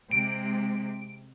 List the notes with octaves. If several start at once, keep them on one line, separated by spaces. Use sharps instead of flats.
C3 G#3 D7